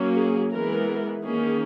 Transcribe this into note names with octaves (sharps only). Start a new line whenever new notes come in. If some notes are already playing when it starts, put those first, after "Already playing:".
Already playing: F#3 A#3 C#4
G#4
E3 G#3 B3 A#4
D#3 A#3 C#4 G#4